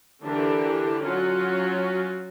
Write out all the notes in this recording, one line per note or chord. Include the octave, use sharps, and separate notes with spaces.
D3 E3 D4 G4 A#4
F#3 C#4 F4 F#4